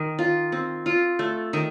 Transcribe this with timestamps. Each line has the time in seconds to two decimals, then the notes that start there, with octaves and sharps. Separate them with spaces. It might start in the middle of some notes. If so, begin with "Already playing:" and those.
Already playing: D#3
0.19 F4
0.52 C4
0.86 F4
1.19 A3
1.53 D#3